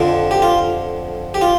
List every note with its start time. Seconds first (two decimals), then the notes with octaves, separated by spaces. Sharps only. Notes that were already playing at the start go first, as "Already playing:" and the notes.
Already playing: F2 D3 F3
0.31 G4
0.42 F4
1.34 G4
1.41 F4